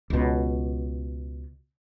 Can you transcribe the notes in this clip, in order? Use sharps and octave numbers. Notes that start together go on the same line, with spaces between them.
C#2 B2